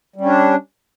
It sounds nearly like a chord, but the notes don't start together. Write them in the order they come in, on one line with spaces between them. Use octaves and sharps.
G3 C#4 D4